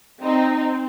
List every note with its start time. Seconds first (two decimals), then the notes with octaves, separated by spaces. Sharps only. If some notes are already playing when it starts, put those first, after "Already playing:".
0.23 C4 D#4
0.58 C4